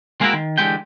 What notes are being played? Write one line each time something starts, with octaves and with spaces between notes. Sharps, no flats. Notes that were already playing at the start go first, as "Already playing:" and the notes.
G#3 A#3 C4 E4 F#4 A#4
D#3
D3 E3 G#3 G4 G5